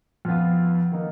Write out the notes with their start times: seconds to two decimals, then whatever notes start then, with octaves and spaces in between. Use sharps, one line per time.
0.25 F2 F3 B3 F4
0.92 D#3 A#3 D#4